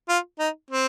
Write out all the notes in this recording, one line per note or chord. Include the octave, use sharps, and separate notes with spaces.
F4
D#4
C4